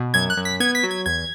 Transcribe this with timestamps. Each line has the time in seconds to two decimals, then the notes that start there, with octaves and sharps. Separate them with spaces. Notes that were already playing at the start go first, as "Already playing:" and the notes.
Already playing: B2
0.14 F#2 G#6
0.30 F#6
0.37 F#2
0.45 B6
0.60 B3 G#6
0.75 B6
0.83 F#3
0.91 G#6
1.06 E2 G#6